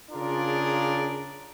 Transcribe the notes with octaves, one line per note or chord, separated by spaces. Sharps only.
C#3 D4 F4 G#4 A#4 D5